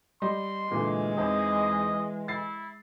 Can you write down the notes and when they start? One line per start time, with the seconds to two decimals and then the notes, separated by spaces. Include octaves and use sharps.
0.22 G3 D#5 C6
0.71 D2 G2 A#2 E3 G#3
1.18 E2 E3 C4 D#4 D#5
2.28 E4 A6 C7